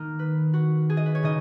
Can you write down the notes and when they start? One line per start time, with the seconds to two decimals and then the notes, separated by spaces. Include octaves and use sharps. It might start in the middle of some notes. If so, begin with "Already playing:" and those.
Already playing: D#3 A#3 D#4 A#4
0.19 B4
0.53 F#4
0.90 G#4
0.97 D#5
1.06 B4
1.15 C#5
1.23 C#3 D#4 D#5